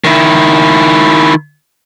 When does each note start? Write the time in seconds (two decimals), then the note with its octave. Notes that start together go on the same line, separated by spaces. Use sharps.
0.04 D#3 E4